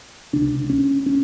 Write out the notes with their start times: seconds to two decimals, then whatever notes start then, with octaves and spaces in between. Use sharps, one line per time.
0.33 C#2 C3 D4
0.70 C#4
1.06 C#4